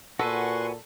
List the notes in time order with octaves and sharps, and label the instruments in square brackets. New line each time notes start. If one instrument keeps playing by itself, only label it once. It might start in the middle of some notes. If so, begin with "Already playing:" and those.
[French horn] A#2 [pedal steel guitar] F#4 B4 G#5 [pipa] A4 [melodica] F#5 C6 C#6